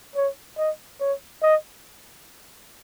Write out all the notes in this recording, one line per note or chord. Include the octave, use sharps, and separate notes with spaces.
C#5
D#5
C#5
D#5